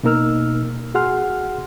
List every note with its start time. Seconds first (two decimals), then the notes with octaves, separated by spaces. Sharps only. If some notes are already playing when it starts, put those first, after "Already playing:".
0.03 B2 A#3 D#4 A#4 E6 F6
0.95 F#4 G#4 F#5 C6 F6